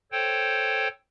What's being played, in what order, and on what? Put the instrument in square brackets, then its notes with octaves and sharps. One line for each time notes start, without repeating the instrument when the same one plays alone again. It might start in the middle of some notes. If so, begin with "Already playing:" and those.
[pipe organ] A4 C5 C#5 G5